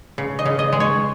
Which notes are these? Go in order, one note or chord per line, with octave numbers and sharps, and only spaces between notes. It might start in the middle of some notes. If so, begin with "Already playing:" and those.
C#3
D#5
C#3
D#5
G#3
C#5